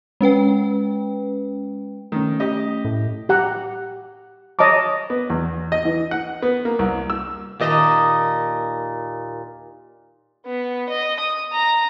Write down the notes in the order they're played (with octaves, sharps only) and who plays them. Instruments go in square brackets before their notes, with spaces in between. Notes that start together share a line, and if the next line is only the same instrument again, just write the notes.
[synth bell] G#3 C#4 B4 G5
[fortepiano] D#3 [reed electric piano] A3 C#4
[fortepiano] G4 D#5
[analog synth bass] A2
[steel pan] G4 F#5 A#5
C#5 D#5 A5 A#5 D6
[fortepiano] B3
E2
D#5
E3
F#5
B3
A#3
C2
E6
[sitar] D#2 A#2 D#5
[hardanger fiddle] B3
D#5
D#6
A#5